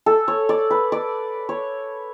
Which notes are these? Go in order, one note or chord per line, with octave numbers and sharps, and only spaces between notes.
A4
C#5
D5
B4
D5
C#5